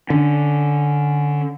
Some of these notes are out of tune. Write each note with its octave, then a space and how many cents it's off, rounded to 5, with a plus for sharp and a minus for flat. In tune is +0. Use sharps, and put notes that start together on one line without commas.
D3 +0 C#4 +10